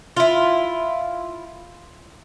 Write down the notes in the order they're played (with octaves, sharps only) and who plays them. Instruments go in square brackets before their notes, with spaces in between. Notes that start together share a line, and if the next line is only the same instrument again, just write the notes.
[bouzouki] E4 F4